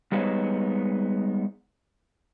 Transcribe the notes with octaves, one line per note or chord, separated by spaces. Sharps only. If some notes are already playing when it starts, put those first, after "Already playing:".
G3 G#3 B3 D#4 C5 C#5